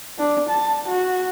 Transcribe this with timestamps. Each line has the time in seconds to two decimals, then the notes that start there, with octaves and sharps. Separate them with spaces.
0.18 D4
0.49 A5
0.88 F#4